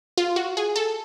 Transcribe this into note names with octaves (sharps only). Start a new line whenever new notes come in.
F4
F#4
G#4
A4